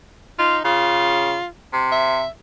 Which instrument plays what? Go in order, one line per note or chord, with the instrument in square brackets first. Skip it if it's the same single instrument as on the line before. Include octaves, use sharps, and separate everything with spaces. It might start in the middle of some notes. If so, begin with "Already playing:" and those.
[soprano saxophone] D#4 [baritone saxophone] F4
[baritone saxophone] C#3 [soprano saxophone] F4
[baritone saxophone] C3
[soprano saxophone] E5